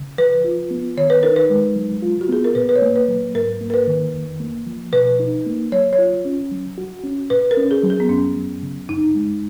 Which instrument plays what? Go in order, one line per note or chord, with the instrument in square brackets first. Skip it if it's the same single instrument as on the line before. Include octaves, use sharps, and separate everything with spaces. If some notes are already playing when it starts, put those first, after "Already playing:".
Already playing: [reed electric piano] C#3
[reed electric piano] F3 [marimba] B4
[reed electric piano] F4
B3
[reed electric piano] D#3 [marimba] C#5
[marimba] B4
[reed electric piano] D#4 [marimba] A#4
[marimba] B4
[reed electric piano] G#3
F#3
F4
[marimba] F#4
[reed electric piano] B3 [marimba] G#4
[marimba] A#4
[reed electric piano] A#2 [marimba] B4
[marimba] B4
C#5
[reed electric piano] A#3
[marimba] B4
[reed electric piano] F#3
[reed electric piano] G#2 [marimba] A#4
[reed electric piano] A#3
[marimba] A#4
B4
[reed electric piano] D#3
F2
A#3
F3
[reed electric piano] B2 [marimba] B4
[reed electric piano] D#4
A#3
[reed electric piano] F#3 [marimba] C#5
[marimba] C#5
[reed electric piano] F4
C#4
F#3
F#4
C#4
[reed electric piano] A#2 [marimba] B4
[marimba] A#4
[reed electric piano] C#4
[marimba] G#4
[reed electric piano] F#3
[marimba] G#4
B3
[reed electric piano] F#2 [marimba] C#4
[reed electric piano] F#3
C#3
[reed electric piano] F#2 [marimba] D#4
[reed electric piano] G#3